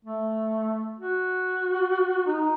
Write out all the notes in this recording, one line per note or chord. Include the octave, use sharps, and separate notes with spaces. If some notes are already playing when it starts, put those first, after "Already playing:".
A3
F#4
D#4